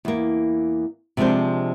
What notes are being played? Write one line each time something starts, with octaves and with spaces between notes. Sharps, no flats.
E2 A#3
C3 F3 G#3 D4 C5